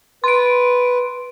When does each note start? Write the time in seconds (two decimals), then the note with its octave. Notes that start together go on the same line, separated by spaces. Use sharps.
0.24 B4 C6 D7